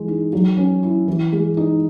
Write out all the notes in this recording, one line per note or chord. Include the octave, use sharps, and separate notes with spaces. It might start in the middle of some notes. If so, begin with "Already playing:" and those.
Already playing: E3 G#3
D#4
F#3
C#4
E4
E3
G#3
D#4